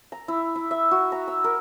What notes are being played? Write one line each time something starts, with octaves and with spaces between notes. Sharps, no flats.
A#5
E4
E4
E5
F#4
A#5
E6
A#4